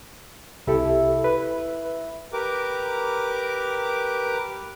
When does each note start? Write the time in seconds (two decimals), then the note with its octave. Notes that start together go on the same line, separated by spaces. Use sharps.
0.67 C2 E4 G4 A4
1.24 B4
2.33 G4 A#4 B4 D6